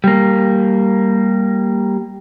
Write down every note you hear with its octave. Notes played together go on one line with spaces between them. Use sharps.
G3 A#3